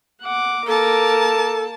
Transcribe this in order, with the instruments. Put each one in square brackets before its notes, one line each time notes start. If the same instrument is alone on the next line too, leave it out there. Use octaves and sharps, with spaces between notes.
[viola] F#5 D6
[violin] A#3 A5 [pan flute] A4 [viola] A#4 D6